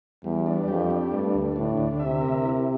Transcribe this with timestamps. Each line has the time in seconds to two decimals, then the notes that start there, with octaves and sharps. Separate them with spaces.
0.24 E2 G3
0.46 D4
0.68 F2 G4
0.90 D4
1.12 G2 A3
1.34 D2
1.56 A2 D4
1.77 D2
1.99 C3 E5
2.21 A#4
2.43 E4